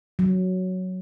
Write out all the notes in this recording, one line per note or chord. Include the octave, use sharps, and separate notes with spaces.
F#3